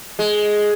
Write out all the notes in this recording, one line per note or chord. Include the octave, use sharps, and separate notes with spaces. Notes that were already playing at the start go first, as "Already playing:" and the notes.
G#3